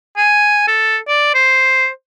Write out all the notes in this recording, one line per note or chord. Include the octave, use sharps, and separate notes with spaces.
G#5
A4
D5
C5